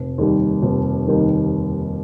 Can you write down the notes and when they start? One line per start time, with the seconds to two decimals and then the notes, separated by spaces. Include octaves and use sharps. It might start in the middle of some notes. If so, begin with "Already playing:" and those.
Already playing: F1
0.18 D#2 D#3 G3 A#3
0.63 F1
1.08 D#2 D#3 G3 A#3